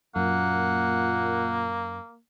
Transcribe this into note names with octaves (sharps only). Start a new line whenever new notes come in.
F#2 A#2 A#3 F#5